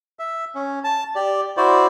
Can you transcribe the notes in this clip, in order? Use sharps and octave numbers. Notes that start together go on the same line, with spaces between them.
E5
C#4
A5
G4 D5
E4 F#4 C5 D5